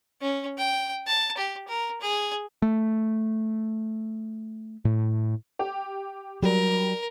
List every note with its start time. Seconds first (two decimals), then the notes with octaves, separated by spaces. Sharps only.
0.21 C#4
0.58 G5
1.07 A5
1.37 G4
1.67 A#4
2.01 G#4
2.62 A3
4.85 A2
5.59 G4
6.43 F#3 G3 A#4